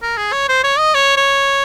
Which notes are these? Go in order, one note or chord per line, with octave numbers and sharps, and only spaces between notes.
A#4
G#4
C#5
C5
C#5
D#5
C#5
C#5